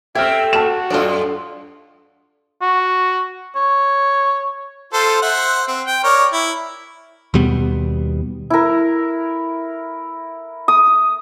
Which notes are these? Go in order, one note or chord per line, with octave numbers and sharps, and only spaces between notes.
A3 C4 G4 E5 F6 G#6
F#4 A5 F6 E7
F#2 F4 A4 D5
F#4
C#5
F4 A4 C5
C5 E5 F#5
C4
G5
A#4 C#5 D5
E4
D#2 B2 G3 B3
E4 A#4
D#6